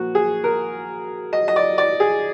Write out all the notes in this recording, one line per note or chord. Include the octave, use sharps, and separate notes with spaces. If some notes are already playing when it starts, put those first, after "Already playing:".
Already playing: A#2 F3 A#3 F#4
G#4
A#4
D#5
D#5
D5
D5
G#4